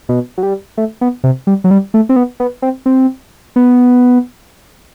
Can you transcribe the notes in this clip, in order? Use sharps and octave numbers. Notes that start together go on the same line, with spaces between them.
B2
F#3
G3
A3
B3
C3
G3
F#3
G3
A3
C4
B3
B3
C4
C4
B3